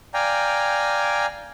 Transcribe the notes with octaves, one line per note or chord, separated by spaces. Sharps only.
D5 F5 G5 G#5 A#5